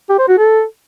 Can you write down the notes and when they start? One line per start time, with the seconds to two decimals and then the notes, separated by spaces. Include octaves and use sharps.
0.09 G4
0.19 C5
0.28 F#4
0.38 A4